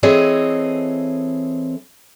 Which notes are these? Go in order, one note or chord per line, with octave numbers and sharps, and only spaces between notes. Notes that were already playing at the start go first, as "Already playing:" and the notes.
E3 C4 G#4 A4 C#5 D#5